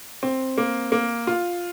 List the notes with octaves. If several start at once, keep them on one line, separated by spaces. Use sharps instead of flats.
C4
A#3
A#3
F4